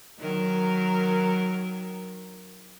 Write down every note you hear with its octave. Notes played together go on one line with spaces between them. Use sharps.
D#3 F#3 A#4